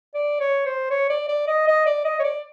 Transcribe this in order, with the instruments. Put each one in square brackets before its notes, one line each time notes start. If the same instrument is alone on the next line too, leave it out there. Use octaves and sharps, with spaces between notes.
[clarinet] D5
C#5
C5
C#5
D5
D5
D#5
D#5
D5
D#5
C#5
D5